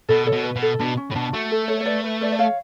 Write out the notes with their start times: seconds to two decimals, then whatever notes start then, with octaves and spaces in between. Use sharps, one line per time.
0.09 B2 A4
0.26 A4 C#5
0.32 B2
0.44 B4
0.56 B2
0.62 A4
0.80 B2 D4
0.97 C#4
1.11 A2
1.15 B2 D4
1.33 A3 F#4
1.51 A4
1.68 A4 C#5
1.81 C#5
1.86 B4 D5
2.04 B4
2.21 B4 D5
2.32 D5
2.39 C#5 F5